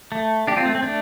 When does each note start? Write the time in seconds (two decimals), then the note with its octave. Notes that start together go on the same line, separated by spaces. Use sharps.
0.12 A3
0.47 D4 G4
0.57 C4 F4
0.65 A3
0.75 C4
0.83 A3 D4